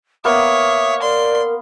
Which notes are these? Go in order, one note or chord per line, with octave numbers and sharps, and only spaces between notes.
A#3 B3 C#5 E5 D#6
A#4 D5 C6